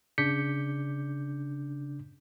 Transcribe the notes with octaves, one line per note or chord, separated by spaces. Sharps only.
C#3 D4 D6 G6 B6 C#7